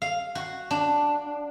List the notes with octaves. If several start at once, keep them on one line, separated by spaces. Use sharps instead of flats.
F5
F#4
D4